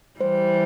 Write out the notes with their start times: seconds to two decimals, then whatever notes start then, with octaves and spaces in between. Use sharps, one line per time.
0.20 E3 G3 C5